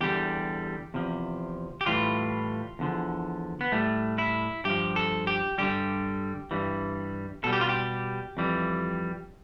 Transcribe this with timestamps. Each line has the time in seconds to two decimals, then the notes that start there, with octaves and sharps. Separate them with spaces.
0.01 E2 D3 G3 G4
0.94 E2 C3 F3
1.81 G4
1.86 A2 E3 G3 F4
2.79 E2 D3 F3
3.61 B3
3.72 A2 G3 A3
4.18 E4
4.65 G2 F3 G4
4.96 A4
5.27 G4
5.58 G2 D3 G3 G4
6.51 G2 E3 G3
7.44 B2 G3 A4
7.53 G4
7.61 F4
7.69 G4
8.37 F2 E3 G3